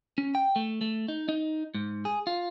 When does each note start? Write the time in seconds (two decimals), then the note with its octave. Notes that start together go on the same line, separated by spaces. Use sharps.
0.18 C#4
0.35 G5
0.56 A3
0.81 A3
1.08 D#4
1.29 D#4
1.74 G#2
2.05 G#4
2.27 F4